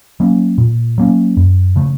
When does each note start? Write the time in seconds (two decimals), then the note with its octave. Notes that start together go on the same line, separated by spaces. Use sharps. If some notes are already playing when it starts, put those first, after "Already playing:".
0.20 F#3 A#3 C#4
0.58 A#2
0.98 F#3 A#3 C#4
1.37 F#2
1.76 C#3 F3 A3